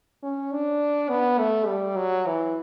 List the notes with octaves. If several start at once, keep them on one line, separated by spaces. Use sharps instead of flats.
C#4
D4
B3
A3
G3
F#3
E3